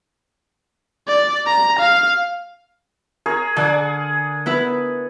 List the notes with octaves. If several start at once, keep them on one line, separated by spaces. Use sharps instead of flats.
D5
A#5
F5
G#4 A#4 C#5
D3 G#4 D5 F#5
B3 E4 B4